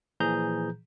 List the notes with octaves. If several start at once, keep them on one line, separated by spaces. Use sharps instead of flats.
A#2 E3 F3 G#4 A#5 G6